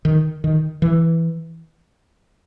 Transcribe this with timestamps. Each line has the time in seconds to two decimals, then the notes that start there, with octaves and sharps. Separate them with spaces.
0.05 D#3
0.44 D#3
0.82 E3